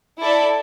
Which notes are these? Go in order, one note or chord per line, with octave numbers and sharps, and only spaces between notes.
E4 A4 D5